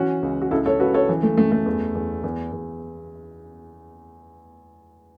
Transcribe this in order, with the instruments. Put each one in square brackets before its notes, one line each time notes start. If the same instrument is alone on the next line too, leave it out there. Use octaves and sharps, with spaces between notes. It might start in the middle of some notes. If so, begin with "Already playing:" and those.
Already playing: [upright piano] E3 C#4 F#4
C#2
F#4
C#2 E4 A4
A4 C#5
C#2 F#4 B4
A4 C#5
E3
A3
F#2 A3
A3
E2
E2
E2
E2